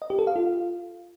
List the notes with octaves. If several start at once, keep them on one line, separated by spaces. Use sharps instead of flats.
D#5
G4
A4
F5
F4